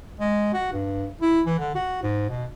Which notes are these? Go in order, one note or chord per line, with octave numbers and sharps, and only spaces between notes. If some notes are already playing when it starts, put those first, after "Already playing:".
G#3
F#4
G2
E4
E3
D3
F#4
G#2
B2